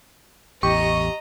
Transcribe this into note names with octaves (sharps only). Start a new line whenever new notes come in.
A1 E2 G4 D#5 A#5 C#6